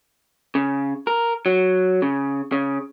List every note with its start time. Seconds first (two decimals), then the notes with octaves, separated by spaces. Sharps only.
0.55 C#3
1.07 A#4
1.46 F#3
2.02 C#3
2.52 C#3